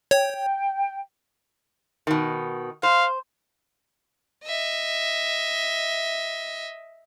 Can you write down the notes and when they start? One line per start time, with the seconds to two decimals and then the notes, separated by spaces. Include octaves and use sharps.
0.11 C#5 G5
2.07 B2 D#3
2.83 C5 F5
4.45 D#5 E5